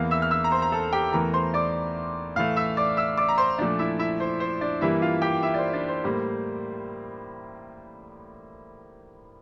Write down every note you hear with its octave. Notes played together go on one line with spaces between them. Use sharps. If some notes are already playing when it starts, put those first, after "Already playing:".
Already playing: E2 E3 A#3 F5 F6
E5 E6
F6
E5 E6
A#5
C5 C6
A#5
A4 A5
G4 G5
E2 E3 A3 A#4 A#5
C5 C6
D5 D6
A2 E3 A3 F5 F6
E5 E6
D5 D6
E5 E6
D5 D6
A#5
C5 C6
A#2 F3 A3 D4 D5
E4 E5
E4 E5
C5
C5
D4 D5
G2 E3 G3 A#3 E4 E5
F4 F5
G4 G5
E4 E5
D5
C5
D4 D5
C5
A2 G3 A#3